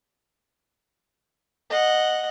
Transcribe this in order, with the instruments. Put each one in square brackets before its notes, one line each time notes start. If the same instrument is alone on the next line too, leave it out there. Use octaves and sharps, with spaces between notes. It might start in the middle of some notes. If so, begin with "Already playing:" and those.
[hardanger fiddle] D#5 F#5